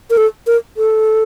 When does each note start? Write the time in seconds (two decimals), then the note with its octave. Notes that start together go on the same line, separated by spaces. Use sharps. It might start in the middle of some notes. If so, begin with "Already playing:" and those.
0.10 A#4
0.17 A4
0.47 A#4
0.77 A4